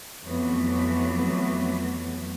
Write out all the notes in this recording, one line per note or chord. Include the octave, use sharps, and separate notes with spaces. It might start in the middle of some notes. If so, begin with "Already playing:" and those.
F2 E3 F#3 A3 B3